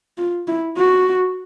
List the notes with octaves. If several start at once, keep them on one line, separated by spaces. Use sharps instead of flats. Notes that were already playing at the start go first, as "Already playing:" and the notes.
F4
E4
F#4